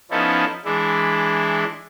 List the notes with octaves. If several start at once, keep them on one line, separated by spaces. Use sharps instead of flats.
F3 B3 C#4 D#4 E4 A4
E3 G#3 D4 E4